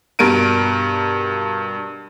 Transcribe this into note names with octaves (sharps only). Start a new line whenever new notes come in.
G2 B2 A#4 D7 D#7